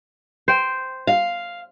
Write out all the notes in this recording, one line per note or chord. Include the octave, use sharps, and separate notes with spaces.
C5 G5
F5